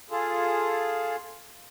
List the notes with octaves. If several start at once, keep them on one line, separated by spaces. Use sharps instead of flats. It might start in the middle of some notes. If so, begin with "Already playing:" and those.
F4 G#4 A4